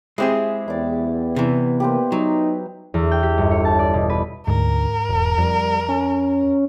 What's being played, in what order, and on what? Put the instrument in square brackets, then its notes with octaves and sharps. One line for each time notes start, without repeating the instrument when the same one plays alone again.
[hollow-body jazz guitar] G#3 C4 G#4 [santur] E4 G4
[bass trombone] E2 [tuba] B3 [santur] E4 D5
[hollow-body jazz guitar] C3 E3
[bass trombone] A#3 [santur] G4 B4 C5
[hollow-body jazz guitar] F#3 [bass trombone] D#4
[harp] E2
G5
G4
G1
C#5
A5
D5
B2
B4
[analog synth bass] D2 [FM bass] G#2 [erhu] A#4
[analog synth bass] E1
[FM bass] F2 [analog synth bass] G3
[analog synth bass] C#4